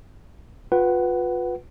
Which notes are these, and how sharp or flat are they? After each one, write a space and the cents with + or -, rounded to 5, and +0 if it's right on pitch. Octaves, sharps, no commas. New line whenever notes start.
F4 +35 B4 +0 F#5 +25